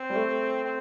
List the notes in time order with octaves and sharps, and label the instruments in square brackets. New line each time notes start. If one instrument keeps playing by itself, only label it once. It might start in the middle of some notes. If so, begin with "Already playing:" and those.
Already playing: [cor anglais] C4
[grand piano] G3
A3
[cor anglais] C4